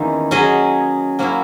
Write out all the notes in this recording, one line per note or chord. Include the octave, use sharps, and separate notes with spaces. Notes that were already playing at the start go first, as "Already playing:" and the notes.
Already playing: E2 D#3 A#3 C#4 E4
F#3 C#4 G#4 D#5
F#3 A#3 C#4 E4